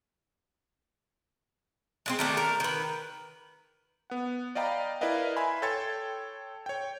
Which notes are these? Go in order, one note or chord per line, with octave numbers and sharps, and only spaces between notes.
G#3 A3 C4
D#3 A3 D4
A#4
D#3 B4
B3 F#5
D5 D#5 F5 G5 A#5 B5
E4 A#4 B4 D5 D#5 F5
E5 G#5 B5 C6
A4 C#5 G5 C6 G#6 A6
C#5 G5